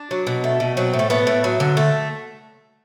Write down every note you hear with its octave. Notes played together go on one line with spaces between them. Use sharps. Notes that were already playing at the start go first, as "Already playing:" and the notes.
Already playing: D4
F#3
B2
A3
B2
F#3 C4
A2
A3
A3 B3
A2
F#3
D3
A3